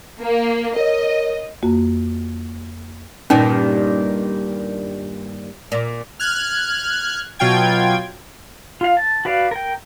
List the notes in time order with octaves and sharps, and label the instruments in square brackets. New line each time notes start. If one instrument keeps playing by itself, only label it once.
[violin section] A#3
[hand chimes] A#4 C#5 [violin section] D#5
[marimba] F2 A#3 F#4
[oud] G2 A#2 D#3 [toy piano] C#4 D#4
[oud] A#2
[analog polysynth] F6 F#6 G#6
B2 F#3 F4 G5 G#6
[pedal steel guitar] F4 F5
A5
F#4 B4 D5 F5
A#4 G5